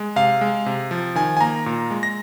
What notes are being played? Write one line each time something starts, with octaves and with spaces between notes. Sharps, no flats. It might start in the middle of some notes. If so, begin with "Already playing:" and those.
Already playing: G#3
C3 F5
G#3
C3
F3
D#3 G#5
G#5
A#3 A#5
A#2
G#3
A#6